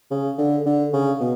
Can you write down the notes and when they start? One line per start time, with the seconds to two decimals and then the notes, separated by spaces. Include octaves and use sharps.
0.11 C#3
0.38 D3
0.66 D3
0.93 C#3
1.20 B2